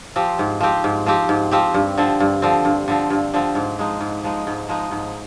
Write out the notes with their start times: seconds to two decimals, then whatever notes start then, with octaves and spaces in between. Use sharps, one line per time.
0.16 F3 C4 G4
0.39 G#2
0.61 F3 C4 G4
0.84 G#2
1.06 F3 C4 G4
1.29 G#2
1.51 F3 C4 G4
1.74 G2
1.98 D3 F3 C4
2.20 G2
2.42 D3 F3 C4
2.65 G2
2.88 D3 F3 C4
3.10 G2
3.34 D3 F3 C4
3.55 G#2
3.79 F3 G#3 D#4
4.01 G#2
4.24 F3 G#3 D#4
4.47 G#2
4.69 F3 G#3 D#4
4.91 G#2